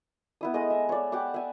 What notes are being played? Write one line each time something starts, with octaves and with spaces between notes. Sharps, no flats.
B3 E4 D#6
G#3 A3 D#5 D#6
E5
C#5 D5
G4 F#5 B5 D6
E5 G#5